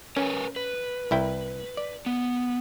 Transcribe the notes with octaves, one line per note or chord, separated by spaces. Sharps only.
C#4 A#4 B4 G#5
B4
C2 E4 G5
D5
B3